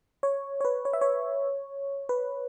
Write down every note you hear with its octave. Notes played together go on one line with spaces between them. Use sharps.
C#5
C#5
B4
C#5
E5
C#5
B4